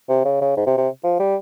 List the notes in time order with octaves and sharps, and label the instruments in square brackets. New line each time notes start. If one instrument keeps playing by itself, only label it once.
[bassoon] C3
C#3
C#3
G#2
C3
C3
F3
G3